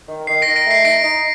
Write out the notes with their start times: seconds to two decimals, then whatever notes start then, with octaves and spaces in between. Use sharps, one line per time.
0.08 D#3
0.27 D#3 C7
0.42 D#3 A#6 D7
0.56 A#6 D7
0.65 A3
0.71 C7
0.85 D#4 A#6 D7
1.04 D#4